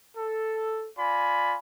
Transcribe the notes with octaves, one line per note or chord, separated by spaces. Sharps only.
A4
F4 D5 G#5 B5